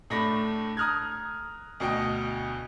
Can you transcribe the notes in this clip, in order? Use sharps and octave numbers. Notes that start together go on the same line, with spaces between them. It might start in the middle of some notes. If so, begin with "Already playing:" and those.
A2 A3 D4 B5 A#6
A#5 D#6 F6 F#6 G#6
D2 B2 D#5 G5